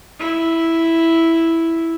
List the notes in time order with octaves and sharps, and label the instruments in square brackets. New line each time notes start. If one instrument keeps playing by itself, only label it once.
[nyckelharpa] E4